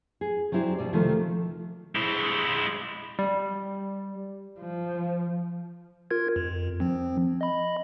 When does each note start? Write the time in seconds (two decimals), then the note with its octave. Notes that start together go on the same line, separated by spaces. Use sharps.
0.21 G#4
0.52 F#3 G3 C4 E4 G4
0.78 B2 D5
0.93 C3 D#3 F3 A3
1.95 G#3 E4
3.19 G3
4.60 F3
6.11 F4 A#4 G#6
6.36 F2
6.80 F3 C4
7.41 D#5 B5